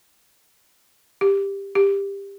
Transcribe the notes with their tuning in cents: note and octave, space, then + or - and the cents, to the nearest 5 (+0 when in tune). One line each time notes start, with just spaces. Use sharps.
G4 +15
G4 +20